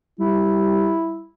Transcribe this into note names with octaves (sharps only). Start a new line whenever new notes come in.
G3 E4